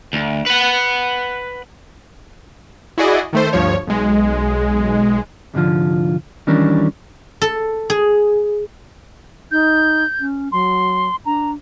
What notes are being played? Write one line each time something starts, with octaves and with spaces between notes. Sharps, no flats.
D2
B4 F#5
E4 F#4 G#4 D5 D#5
D#3 A3 C5
D2 G2 F3 C#5
B1 G#3
C2 G#2 D3 F3 F4
D#3 E3 G3 C#4 D4 A#4
A4
G#4
D#4 G6
C#4
F#3 C6
D4 A#5